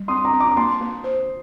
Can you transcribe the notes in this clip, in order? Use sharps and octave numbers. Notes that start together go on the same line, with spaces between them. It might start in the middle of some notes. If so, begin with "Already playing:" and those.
Already playing: G3
C4 C6 D#6
A#5 D6
C4
A#5 D6
D6
A#3 A5 C6
A#3
C5